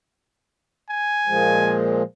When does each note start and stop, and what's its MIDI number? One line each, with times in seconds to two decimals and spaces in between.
0.90 1.82 80
1.27 2.03 46
1.27 2.03 53
1.27 2.03 56